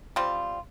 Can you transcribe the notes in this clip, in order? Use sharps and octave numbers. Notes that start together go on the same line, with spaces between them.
G3 C4 F4